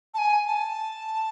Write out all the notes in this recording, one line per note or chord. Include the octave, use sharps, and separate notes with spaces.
A5
G#5
A5